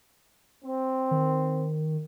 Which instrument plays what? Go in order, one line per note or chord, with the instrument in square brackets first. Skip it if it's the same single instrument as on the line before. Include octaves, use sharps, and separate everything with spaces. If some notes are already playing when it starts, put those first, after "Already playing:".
[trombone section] C4
[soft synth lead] D#3